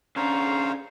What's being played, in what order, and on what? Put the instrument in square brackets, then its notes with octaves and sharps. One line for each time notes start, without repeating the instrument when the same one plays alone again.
[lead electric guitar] C#3 D4 [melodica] C5 C#5 F5 [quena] A#5